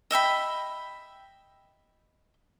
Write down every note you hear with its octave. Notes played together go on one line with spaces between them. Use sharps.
D#5 E5 G5 B5